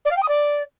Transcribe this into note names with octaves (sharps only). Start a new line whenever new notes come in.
D5
F5
G5
D#6
D5